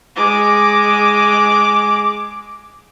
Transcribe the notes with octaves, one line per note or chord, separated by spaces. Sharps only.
G#3 D6